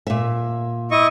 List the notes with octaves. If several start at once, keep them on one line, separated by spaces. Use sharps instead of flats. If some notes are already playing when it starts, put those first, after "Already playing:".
A#2 E5
E4 D#5 C#6